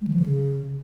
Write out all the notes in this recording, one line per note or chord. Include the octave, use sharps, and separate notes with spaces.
G#3
D#3
F3
D3
C#3